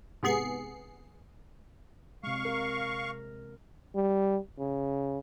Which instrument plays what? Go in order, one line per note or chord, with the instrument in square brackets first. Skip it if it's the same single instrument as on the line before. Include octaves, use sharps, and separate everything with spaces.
[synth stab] G#2 C3 B3 G#4 C7 C#7
[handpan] C3 G#3 [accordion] F5 C#6
[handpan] A#4
[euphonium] G3
C#3